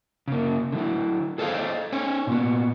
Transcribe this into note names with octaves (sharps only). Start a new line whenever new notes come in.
C#3 A#3
D3 F#3 E4
G#4 A4 C5 D#5 F5
C#4 C5 C#5
A#2 B3